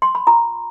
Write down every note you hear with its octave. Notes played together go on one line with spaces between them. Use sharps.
C6
B5
F4 A#5